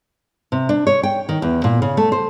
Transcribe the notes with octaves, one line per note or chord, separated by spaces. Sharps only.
C3
D4
C#5
G5
D#3
E2
A#2
C#3
A3
C5